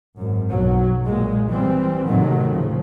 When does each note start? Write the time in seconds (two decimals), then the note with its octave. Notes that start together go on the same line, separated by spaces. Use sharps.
0.17 G#1 F#2
0.51 B1 F#3
1.04 G2 A#2 G#3
1.49 E3 G3 C4
2.08 D#2 A2 C3 D#3 F#3 A3
2.52 C#3 F3